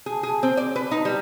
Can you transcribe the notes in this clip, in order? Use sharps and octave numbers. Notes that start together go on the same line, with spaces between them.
G#4
G#4
C4
D5
B4
D#4
G3